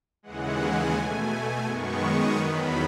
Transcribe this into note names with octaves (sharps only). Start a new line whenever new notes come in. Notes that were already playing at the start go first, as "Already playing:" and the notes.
D#2 C#3 E3 G#3 F#5
G#5
B2 A3 G#5
F#2 D#3 G#3 B3 C#6
D#6
E2 D#3 F#3 B3 B5